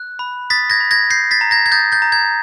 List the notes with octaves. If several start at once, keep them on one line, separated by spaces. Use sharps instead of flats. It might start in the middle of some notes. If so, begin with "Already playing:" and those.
Already playing: F#6
B5
D#6 A6 B6
G#6 A#6
B5
G#6 A#6
G6 A#6 C7
A6 B6
A#5
G#6 A#6
G#6
D#6 G6 A6
G6 A6
A#5
G#6